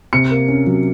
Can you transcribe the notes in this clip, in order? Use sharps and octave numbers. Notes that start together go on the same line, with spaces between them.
C3 C#7
A#3
C#4
F#3